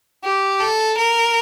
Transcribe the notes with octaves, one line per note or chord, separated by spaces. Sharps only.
G4
A4
A#4